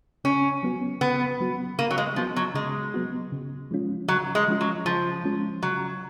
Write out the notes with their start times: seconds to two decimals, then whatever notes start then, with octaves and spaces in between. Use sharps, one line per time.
0.24 C#3 C#4
0.63 F#3 B3 F#4
1.01 C#3 B3
1.40 F#3 B3 F#4
1.79 C#3 A#3
1.91 F#3
1.98 G#3
2.16 F3 F#3 B3 F#4
2.36 F#3
2.54 C#3 G#3
2.94 F#3 B3 F#4
3.32 C#3
3.71 F3 G#3 C#4 F4
4.08 C#3 F#3
4.35 G#3
4.48 F3 G#3 C#4 F4
4.61 F#3
4.85 C#3 F3
5.24 F3 G#3 C#4 F4
5.63 C#3 F#3